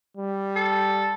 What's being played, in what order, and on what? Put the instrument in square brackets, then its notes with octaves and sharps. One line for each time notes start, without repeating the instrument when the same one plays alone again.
[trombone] G3
[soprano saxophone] A4